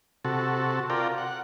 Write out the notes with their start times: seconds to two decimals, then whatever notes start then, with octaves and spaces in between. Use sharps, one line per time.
0.25 C3 F#4 A4
0.90 F4 A#4 D5 G5
1.18 F#5